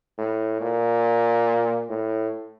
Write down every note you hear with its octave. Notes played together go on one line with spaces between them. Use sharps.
A2
A#2
A2